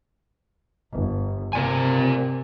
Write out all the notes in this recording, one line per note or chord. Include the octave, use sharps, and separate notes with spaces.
G1
C3 C4 A#4 D5 G#5